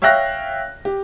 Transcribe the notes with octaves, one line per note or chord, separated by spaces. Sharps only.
C#5 E5 F5 G5 F#6 A#6
G4